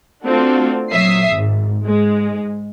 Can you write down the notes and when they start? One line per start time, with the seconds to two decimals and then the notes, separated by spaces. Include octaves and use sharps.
0.24 A3 C4 D4 F4 F#4 A4
0.91 A#2 F#3 E5 D#6 C7
1.30 G#1 G#2
1.84 G#2 G#3